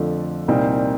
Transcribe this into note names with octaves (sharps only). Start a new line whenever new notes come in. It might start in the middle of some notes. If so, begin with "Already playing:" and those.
Already playing: F2 D3 F3 A3
C2 A#2 G3 C4 D#4